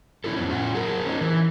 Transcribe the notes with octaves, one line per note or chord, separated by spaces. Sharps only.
C#4 D4 E4 F#4 A4
F2 B3 C#4
C#4 F4 F#5
F#3 G#4 A#4
C#4 D#4
E3